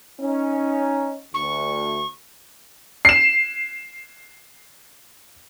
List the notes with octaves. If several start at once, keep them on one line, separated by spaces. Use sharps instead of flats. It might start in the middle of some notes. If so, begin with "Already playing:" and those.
C#4 D#4
D2 C#6
C7 E7